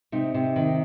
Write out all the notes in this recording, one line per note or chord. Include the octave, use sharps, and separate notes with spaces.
C3 D#4
C3
D#3